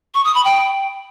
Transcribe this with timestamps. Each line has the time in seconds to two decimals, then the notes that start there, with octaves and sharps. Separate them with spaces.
0.15 C#6
0.25 D#6
0.35 B5
0.45 G5